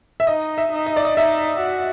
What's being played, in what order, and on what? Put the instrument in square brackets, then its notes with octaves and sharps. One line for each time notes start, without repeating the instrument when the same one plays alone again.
[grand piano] E5
[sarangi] D#4 [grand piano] D#5
[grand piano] E5
[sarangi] D#4
[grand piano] D#5
D5
D#5
[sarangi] D#4 [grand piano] E5
[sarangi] F#4